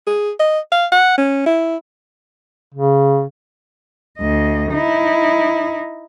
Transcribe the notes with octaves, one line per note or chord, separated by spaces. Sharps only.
G#4
D#5
F5
F#5
C#4
E4
C#3
D2 D#5
D#4 E4